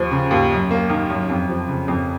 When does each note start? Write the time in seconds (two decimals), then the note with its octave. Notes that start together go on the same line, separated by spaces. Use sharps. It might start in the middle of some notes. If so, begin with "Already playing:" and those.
Already playing: D#2 F3
0.11 C#3
0.31 D#2
0.51 F#2
0.71 A#3
0.90 D#3
1.10 F#2
1.29 F2
1.49 F3
1.68 C#3
1.88 F2